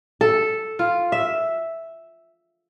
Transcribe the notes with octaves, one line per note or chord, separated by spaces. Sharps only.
A4
F4
E5